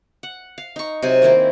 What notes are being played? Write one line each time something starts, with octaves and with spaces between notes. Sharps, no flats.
F#5
F5
D#4 C#6
C3 F#3 C5 G#5
D#3 A#3 C4 E4